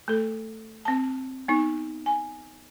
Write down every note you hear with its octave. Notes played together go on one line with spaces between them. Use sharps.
A3 A4
C4 A5
B3 D#4
G#5